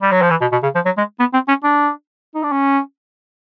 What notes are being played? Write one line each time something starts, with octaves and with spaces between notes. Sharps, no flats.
G3
F#3
F3
E3
B2
B2
C#3
F3
F#3
G#3
B3
C4
C#4
D4
D#4
D4
C#4